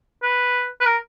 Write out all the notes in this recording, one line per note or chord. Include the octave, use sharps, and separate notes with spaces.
B4
B4
A#4